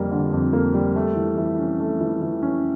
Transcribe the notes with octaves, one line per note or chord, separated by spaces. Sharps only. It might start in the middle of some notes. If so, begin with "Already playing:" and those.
Already playing: F2 D3 G3 A#3
D3
F2
A#3
G3
A3
E3
E3
C#4
A3
E3
E3
C#4